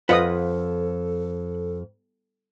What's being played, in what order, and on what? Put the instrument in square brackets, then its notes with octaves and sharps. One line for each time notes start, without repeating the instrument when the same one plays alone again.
[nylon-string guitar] F2 [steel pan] F4 D#5 D#6 [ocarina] A4 [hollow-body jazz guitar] B4 C5 F#5